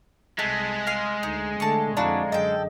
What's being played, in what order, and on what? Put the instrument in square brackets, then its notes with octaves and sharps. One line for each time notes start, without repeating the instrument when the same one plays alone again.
[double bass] C2 [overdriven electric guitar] G#3 [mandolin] A3 [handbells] F#6 A6 B6
[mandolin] F5 C6
[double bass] D2 [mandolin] D#4
[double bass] D3 A3 [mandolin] A5 C#6
[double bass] F2 D3 [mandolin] D4 E4 F#4 [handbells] D5 F5 A#5
[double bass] F#2 D3 [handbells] G#4 D#5 [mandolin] A4 G5